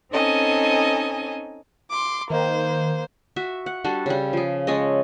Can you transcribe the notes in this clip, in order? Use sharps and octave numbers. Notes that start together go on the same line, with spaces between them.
C4 C#4 D#4 A4 D#5 G#5
C6 D6
D#3 A#3 C5
F#4 E5
F#5
G3 D4 F#4 A4
C#3 G3
F3 G#4
G#3 C#4 A4 D#5